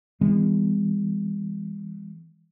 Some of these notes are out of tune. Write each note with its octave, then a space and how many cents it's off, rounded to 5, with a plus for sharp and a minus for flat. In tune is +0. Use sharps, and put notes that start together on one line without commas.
E3 +0 G#3 -45 B3 +45